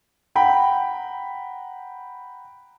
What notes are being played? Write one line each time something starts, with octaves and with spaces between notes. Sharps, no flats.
F#5 G5 A#5 B5